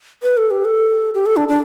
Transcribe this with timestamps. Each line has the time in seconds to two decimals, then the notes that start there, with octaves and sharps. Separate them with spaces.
0.23 B4
0.37 A4
0.51 G4
0.65 A4
1.14 G4
1.26 A4
1.36 D4
1.48 D4